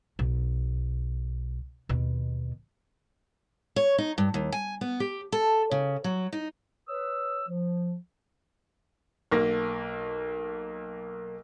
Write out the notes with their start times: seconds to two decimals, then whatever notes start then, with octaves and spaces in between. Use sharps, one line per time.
0.19 B1
1.89 D#2 B2
3.76 C#5
3.98 D#4
4.18 G2
4.34 D#2
4.52 G#5
4.81 B3
5.00 G4
5.32 A4
5.71 C#3
6.04 F#3
6.33 D#4
6.88 B4 C#5 D#6 E6
7.48 F3
9.32 B1 A#3 A#6